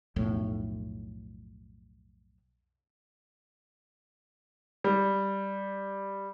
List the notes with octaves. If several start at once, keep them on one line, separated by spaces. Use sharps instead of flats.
B1 F2 A2
G3